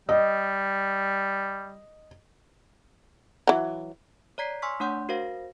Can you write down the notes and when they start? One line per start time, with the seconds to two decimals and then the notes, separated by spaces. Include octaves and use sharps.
0.09 G3 D#5
3.47 E3 F#3
4.38 C#5 D5 A#5 G#6 B6 C7
4.62 G#5 C6 C#6 E6 F6 B6
4.80 A3 D4 C#5 F#5 C6 G6
5.09 F#4 A#4 C5 F5 A#6